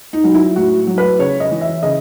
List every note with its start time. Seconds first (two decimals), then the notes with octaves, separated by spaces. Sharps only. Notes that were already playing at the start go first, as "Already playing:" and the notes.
0.13 D#4
0.24 F#3
0.34 E4
0.56 A2 F#4
0.87 F#3
0.98 B4
1.19 C#3 C#5
1.40 D#5
1.51 E3
1.61 E5
1.83 C#3 D#5